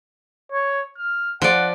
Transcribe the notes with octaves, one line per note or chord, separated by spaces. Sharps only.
C#5
F6
F3 D5 F#5